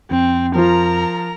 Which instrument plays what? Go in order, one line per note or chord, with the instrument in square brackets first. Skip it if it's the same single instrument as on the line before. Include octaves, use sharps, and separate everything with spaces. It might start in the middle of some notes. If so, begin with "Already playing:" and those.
[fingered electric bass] F2 [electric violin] C4
[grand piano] F3 F4 [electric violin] A#4 A#5